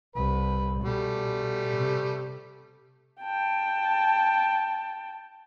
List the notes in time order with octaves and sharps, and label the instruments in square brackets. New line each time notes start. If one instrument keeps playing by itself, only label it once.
[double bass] C2 [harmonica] B4
[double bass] B2 [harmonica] G3 A3
[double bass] C3
[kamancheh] G5 A5